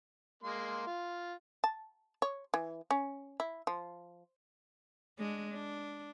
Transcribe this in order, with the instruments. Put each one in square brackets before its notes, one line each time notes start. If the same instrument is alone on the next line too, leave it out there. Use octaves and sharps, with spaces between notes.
[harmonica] G#3 A#3 C6
F4
[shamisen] A5
C#5
E3
C#4
E4
F3
[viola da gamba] G#3 D4
D4